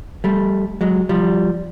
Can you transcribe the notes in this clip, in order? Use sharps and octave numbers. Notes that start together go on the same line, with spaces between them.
G3 A3
F#3 G#3
F3 G3